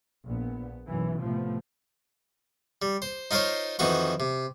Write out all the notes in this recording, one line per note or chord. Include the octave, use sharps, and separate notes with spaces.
A#1 B3
B1 F#2 E3
A2 C3 F3 A3 B3
G3
C5
D#4 F4 A#4 C5 C#5
F2 D#3 E3 C4 F#4 C#6
C3